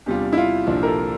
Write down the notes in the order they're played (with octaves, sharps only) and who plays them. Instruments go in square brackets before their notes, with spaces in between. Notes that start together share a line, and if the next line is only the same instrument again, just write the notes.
[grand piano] E2 C3 G3 D4 F4 [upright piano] G4
[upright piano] E4
F4
[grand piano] C2 A#2 F3 [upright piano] D4
[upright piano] A#4
A4